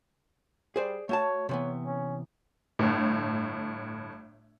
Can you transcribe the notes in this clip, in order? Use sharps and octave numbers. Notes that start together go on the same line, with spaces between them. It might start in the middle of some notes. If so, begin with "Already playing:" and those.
G3 G#4 C5 D5
A3 F#4 C#5 A5
C3 E3 B3 C#5
C#4
G1 A2